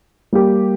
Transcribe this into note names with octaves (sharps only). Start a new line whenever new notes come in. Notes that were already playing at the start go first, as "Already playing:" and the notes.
G3 A#3 G4